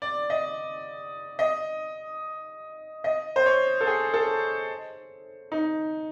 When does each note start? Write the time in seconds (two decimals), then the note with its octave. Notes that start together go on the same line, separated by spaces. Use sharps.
0.02 D5
0.30 D#5
1.39 D#5
3.04 D#5
3.36 C5
3.46 C#5
3.81 A4
3.87 G#4
4.14 A4
5.52 D#4